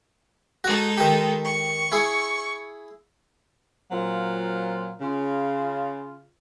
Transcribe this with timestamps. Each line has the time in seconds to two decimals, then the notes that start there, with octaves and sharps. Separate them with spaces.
0.64 G#3 D#4 F#4 A4
0.97 D#3 G4
1.44 C#6
1.92 E4 G#4
3.92 A#2 F#3 C4 F4
5.01 C#3 F4